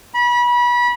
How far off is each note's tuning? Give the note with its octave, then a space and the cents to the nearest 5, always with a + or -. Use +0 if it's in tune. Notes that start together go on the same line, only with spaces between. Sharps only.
B5 -30